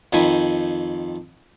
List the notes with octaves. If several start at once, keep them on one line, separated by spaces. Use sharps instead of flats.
F2 D#3 F3 G#5 B5